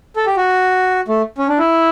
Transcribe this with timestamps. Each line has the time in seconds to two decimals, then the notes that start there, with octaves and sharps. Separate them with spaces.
0.16 A4
0.26 G4
0.37 F#4
1.08 A3
1.38 C#4
1.49 D4
1.58 E4